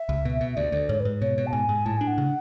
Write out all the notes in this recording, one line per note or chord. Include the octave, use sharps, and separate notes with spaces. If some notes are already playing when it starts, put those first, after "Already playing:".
Already playing: E5
C#2
B2
B2
D2 D5
D2
G#2 C#5
B4
G#2
B2 C#5
B2
A5
G#2 G#5
G#2
A2 A5
D4 G#5
F#5
C#3